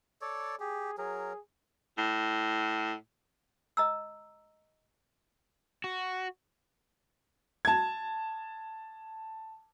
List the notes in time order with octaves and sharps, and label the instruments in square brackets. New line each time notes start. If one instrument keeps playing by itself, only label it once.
[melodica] A4 C#5 D5
[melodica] G4 [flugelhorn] G#4
[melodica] F#3 A#4 [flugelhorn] G#4
[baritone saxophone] A2
[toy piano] D#5 A#5 E6
[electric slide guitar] F#4
[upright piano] A5 G#6